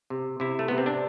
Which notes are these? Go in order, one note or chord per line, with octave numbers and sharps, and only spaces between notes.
C3
C3 E4
A3
C3 B3
C4
D4